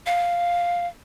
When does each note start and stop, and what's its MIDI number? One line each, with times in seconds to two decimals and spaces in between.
0.06 0.87 77